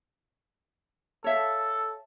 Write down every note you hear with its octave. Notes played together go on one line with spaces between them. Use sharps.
A4 C#5 E5 F5